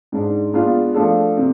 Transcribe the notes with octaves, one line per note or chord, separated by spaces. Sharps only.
G#2 G#3 D4
G#3 B3 D4 F4
F3 A3 D4 A4
C3